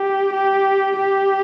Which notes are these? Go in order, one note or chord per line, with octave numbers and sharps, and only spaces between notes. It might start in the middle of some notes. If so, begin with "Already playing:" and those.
Already playing: G4
G4
G4